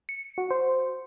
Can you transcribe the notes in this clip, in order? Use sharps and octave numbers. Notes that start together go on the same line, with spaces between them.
C#7
F#4
C5